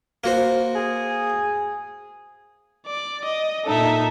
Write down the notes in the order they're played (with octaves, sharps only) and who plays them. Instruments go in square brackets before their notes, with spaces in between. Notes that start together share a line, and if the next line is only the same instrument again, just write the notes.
[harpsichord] A#3 F#4 C5
[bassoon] G#4
[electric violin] D5
D#5
[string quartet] A#2 D#4 [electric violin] A4 E5